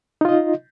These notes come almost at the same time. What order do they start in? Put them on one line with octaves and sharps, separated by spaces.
D#4 F4 D#5